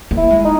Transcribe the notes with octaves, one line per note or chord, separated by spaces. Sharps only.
A#3
E4
G#3
D#4